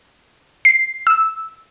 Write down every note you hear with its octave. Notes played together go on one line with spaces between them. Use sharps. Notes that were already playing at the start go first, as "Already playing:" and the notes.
C7
E6